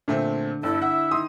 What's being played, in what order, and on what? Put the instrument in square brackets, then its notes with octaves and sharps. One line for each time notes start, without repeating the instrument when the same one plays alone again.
[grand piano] A#2 A3 C4 [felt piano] D3
[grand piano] G1 [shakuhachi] E4 [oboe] A4
[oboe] E5 [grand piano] F#5
[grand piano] D#3 D#6 [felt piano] C6